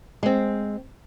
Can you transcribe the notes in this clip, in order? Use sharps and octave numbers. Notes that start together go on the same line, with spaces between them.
G#3 C4